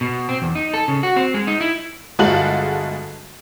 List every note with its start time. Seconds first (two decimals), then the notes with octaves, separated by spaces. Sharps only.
0.01 B2
0.29 C4
0.42 E2
0.55 D#4
0.74 A4
0.88 C#3
1.03 F#4
1.16 C4
1.34 G#3
1.47 D#4
1.61 E4
2.19 G1 G#3 F#4 A4 F5 F#7